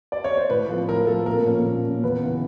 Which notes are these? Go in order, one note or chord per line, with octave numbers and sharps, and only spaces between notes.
D5
C#5
C5
A2 B4
F3 A3 C4
A2 A#4
F3 A3 C4 A4
A#2 A#4
F3 A#3 C#4
A#2
F3 A#3 C#4
E2 B4
C#3 E3